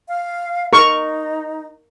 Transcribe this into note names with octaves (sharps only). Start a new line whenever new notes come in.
F5
D#4 A#4 C#6